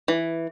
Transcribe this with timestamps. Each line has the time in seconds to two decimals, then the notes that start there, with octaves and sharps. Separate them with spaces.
0.08 E3